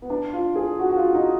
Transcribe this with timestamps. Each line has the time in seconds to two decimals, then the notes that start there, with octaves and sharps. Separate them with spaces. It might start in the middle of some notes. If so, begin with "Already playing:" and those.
0.02 B3
0.10 D4
0.33 F4
0.56 G#4
0.79 F#4
0.89 F#4
0.96 F4
1.14 D#4